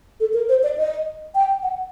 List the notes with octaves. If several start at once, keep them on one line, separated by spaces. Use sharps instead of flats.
A4
A#4
C5
D5
D#5
G5
F#5